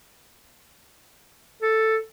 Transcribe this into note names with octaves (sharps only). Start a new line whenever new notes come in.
A4